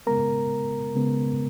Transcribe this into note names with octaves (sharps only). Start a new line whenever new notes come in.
C#3 G#3 B3 A#4 A#5
C#3 G#3 B3